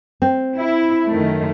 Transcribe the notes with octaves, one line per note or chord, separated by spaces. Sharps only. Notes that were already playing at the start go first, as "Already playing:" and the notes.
C4
E4
F#2 D#3 A3